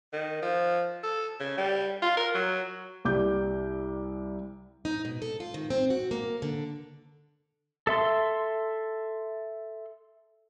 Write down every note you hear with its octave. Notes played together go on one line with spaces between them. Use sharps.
D#3
F3
A4
C#3
G3
F4
A#4
F#3
C2 G3 D6 G6
D#4
B2
A4
F4
D#3
C4
F#4
A#3
D3
A4 E5 C6